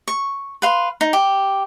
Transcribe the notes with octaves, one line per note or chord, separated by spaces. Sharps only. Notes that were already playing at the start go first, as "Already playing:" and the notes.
C#6
B4 F5 C6
D#4
G4